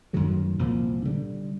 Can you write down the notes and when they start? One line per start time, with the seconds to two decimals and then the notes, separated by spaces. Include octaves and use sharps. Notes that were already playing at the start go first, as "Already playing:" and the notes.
0.13 F#2 D#3 F#3 A3
0.59 C2 A#2 F3
1.05 D3 G3